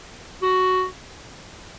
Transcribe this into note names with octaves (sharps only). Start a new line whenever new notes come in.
F#4